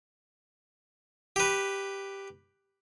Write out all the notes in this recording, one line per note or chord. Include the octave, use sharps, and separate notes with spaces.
G4 B4